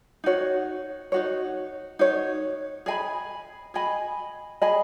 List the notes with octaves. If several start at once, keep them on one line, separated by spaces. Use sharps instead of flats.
D#4 F#4 C#5
D#4 F#4 C#5
D#4 F#4 C#5
G#4 D#5 G#5 B5
G#4 D#5 G#5 B5
G#4 D#5 G#5 B5